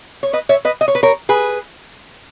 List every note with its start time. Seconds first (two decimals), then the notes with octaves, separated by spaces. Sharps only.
0.23 C#5
0.33 B4 D#5
0.49 C#5 E5
0.65 B4 D#5
0.81 D#5
0.88 C#5
0.95 B4
1.03 A#4 C#5
1.29 G#4 B4